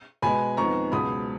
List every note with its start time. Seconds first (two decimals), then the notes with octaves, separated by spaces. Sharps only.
0.22 B2 G#3 B3 G#5 B5
0.57 F2 D#3 G#3 B3 A#5 C#6
0.92 C#2 B2 F#3 B5 D#6